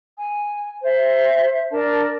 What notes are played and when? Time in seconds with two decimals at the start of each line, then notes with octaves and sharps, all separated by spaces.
0.17 G#5
0.83 C5 E5
1.72 D4 A#4 D5 A5